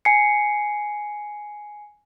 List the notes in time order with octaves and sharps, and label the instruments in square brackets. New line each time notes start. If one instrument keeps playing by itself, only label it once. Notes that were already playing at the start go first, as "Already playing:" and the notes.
[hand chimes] G#5 C7 C#7